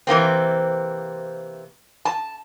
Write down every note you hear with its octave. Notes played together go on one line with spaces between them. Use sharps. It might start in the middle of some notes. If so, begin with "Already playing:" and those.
C3 E3 A#3 C4
A5